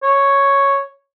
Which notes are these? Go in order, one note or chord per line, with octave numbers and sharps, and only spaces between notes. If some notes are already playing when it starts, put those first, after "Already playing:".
C#5